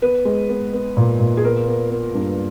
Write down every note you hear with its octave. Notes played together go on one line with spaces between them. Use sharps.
B3 B4
G#3
B3
B3
A#2
A#2
G#4
B3 A#4
B3
B3
G2